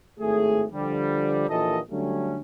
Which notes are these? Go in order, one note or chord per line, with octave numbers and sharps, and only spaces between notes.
G#1 A2 A3 G#4
D3 F3 G3
A#1 D#2 A#2 E3 A4 D#5
D3 F#3 G3 A3 C#4